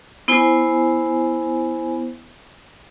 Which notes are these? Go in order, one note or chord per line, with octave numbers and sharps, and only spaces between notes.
B3 E4 C5 G#5